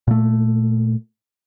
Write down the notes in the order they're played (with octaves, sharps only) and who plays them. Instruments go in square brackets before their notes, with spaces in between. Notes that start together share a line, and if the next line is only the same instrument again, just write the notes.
[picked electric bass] A#2 A3